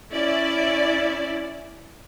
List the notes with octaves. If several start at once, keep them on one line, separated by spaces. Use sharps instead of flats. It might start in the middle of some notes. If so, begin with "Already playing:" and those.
C#4 E4 D5